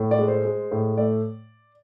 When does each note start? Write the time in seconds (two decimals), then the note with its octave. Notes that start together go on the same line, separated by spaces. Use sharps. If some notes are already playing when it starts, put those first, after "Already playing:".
Already playing: A2
0.11 D5
0.19 G#3
0.28 C5
0.45 G#3
0.71 A2
0.98 A3 D5